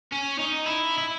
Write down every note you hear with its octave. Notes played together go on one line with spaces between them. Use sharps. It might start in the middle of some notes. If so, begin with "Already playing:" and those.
C#4
D#4
E4
E4